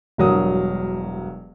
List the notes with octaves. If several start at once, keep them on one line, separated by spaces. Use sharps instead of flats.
E1 G2 F#3 A#4 D#6